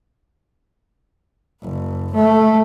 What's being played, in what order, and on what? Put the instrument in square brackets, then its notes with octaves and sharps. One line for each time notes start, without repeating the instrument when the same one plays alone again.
[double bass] F#1
A3